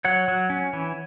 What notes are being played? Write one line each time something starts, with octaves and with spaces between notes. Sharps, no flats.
F#3 C#5 F#5
F#3
C#4
E3